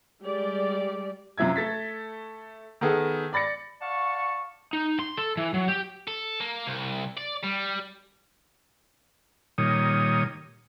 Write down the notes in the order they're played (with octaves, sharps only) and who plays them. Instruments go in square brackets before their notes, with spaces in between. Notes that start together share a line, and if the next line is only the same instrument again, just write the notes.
[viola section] G3 G#3 G4 D5
[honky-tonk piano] F#2 C3 F3 E5 G#6
A3 A4 A6 B6
D#3 B3 G#4 A4
D5 B5 A6 A#6 C#7
[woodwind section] D5 F5 F#5 A5 C#6
[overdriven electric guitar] D#4
C6
A4
E3
F#3
G4
[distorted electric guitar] A4
A#3
C2
D5
G3
[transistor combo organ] A#2 D#3 G3 C#5 D#6